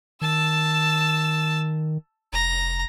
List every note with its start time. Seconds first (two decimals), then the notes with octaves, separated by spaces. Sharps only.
0.21 D#3 A5 E6
2.33 F1 A#5